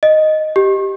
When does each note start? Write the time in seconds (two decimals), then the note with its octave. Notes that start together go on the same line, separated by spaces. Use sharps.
0.03 D#5
0.56 G4